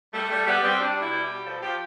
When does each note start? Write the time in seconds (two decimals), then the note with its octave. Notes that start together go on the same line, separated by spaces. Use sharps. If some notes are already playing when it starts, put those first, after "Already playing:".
0.14 G3 A3
0.30 G3 A3
0.47 G3 B3
0.64 G3 C4
0.80 G3 D4
0.97 B2 E4
1.12 G3
1.24 G4
1.30 B2
1.46 F3 A4
1.62 F3 G4